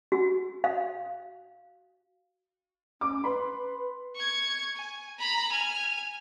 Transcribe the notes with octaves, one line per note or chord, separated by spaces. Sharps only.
F#4
F5
C#4 D6
B4 B5 C6
C#6 G#6
G#5
A#5 B5
G#5 F6